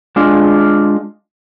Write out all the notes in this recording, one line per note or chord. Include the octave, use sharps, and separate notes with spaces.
G#3 D4 F4